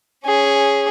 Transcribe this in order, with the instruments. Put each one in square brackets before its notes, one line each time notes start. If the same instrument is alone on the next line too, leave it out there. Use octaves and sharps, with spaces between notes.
[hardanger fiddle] C#4 G#4